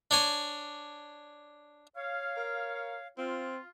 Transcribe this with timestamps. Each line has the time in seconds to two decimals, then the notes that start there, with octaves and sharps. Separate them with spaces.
0.11 D4 C#5 G#5
1.97 C#5 F5
2.37 A#4
3.18 C4 F4